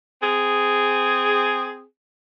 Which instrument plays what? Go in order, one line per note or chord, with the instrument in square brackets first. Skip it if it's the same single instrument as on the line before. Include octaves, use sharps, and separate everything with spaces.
[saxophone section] C4 G#4